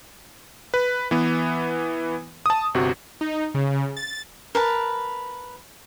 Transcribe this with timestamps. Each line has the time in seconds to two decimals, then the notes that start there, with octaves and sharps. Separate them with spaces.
0.74 B4
1.11 E3 B3
2.46 A5 D#6
2.74 G1 C3 F#4
3.21 D#4
3.54 C#3
3.97 A6
4.55 A#4 B4 A5